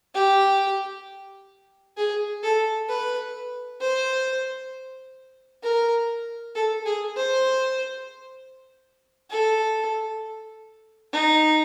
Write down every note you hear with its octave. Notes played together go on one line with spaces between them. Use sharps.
G4
G#4
A4
B4
C5
A#4
A4
G#4
C5
A4
D#4